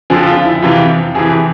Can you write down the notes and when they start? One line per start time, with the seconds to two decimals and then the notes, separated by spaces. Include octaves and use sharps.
0.10 F2 D3 F3 G#4
0.27 F4
0.45 E4
0.62 F2 C3 E3 F4
1.15 F2 C3 E3 G#4